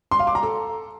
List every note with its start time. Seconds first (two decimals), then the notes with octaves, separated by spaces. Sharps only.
0.11 C6
0.19 F5
0.27 D6
0.35 A#5
0.43 A4